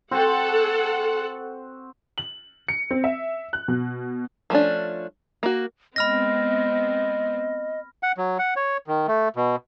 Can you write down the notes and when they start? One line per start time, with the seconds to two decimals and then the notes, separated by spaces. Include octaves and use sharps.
0.11 C4 F#4 A4 C5 F#5
2.18 F#7
2.68 C#7
2.91 C4
3.04 E5
3.53 F#6
3.68 B2
4.50 F3 A3 C#4 D4
5.43 A#3 F#4
5.96 G#3 B3 C4 D#5 B5 F6 A#6
8.03 F#5
8.17 F#3
8.39 F#5
8.56 C#5
8.87 D#3
9.08 A3
9.36 B2